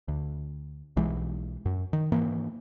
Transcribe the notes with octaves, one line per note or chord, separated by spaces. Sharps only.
D2
B1 E3 G#3
F#2
D#3
G#2 E3 A#3